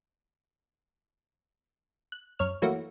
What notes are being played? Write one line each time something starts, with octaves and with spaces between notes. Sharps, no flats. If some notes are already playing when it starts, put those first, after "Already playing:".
F#6
F#2 C#5 F6
E3 F#3 A3 A#3 F#4